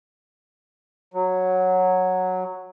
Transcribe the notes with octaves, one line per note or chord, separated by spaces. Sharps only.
F#3